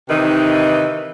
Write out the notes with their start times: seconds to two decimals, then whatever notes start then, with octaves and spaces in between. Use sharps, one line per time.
0.09 C3 D#3 E3 D#4 B4